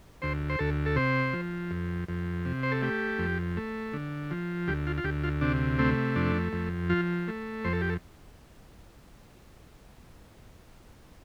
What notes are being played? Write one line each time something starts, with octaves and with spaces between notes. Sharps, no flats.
D2 C5
C5
D2 A4
A4
C3 C5
F3
F2
F2
C3
C5
A4
A3 G4
F2
A3
D3
F3
D2 G4
F4
F4
D2 G4
F4
C3 D4
A3 C4
F2 D4
F2
F3 F4
A3
F2 C5
A4
G4
A4